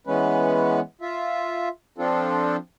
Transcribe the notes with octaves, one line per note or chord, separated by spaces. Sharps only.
E3 G#3 B3 C#4 B4
F4 E5
F3 C4 D4 F4 A4